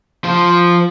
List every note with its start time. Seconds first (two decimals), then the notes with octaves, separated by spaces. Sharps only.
0.24 F3 C5